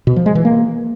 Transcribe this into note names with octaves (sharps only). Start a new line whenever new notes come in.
B2
F3
G#3
E3
A#3